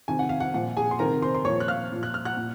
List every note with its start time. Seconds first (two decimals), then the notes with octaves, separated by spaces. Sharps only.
0.08 C3 D#3 G#5
0.19 F#5
0.29 F5
0.40 F#5
0.54 A#2 F3 F#5
0.77 G#4 G#5
0.91 C6
0.99 C3 D#3 A#4 A#5
1.22 C5 C6
1.35 C6
1.45 A#2 F3 C#5 C#6
1.60 F#6
1.68 F5 F6
1.92 A#2 F3
2.03 F#6
2.14 F6
2.25 F#5 F#6
2.37 A#2